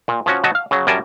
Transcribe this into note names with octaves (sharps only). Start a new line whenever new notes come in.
A#2
F3 C#4 F#4
F#3 F#4 D#5 A5
F5
C#3 F#3
F#2 G3 A#4 G#5 A5